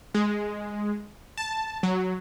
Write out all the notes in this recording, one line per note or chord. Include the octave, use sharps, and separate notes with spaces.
G#3
A5
F#3